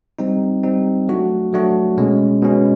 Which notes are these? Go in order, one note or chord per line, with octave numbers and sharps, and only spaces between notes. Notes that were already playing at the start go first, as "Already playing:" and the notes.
G3 C4 D#4
G3 C4 D#4
F#3 A3 D4 F#4
F#3 A3 D4 F#4
B2 G#3 C#4
B2 G#3 C#4